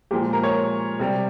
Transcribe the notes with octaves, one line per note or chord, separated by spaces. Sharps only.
A#2 F3 G#3 G4
A#4
C#5
C3 G3